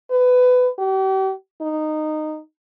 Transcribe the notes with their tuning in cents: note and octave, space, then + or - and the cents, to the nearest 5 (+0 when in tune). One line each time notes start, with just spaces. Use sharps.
B4 +20
G4 -40
D#4 -15